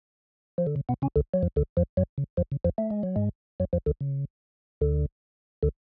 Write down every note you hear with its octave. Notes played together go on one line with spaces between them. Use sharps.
F3
D3
C#3
B2 B3
C#3 C#4
D2 D3
F#3
F2 F3
D2 D3
F2 F3
F#2 F#3
C#3
F2 F3
C#3
F2 F3
A3
G#3
F#3
G#2 G#3
F#2 F#3
F2 F3
D2 D3
C#3
D2 D3
D2 D3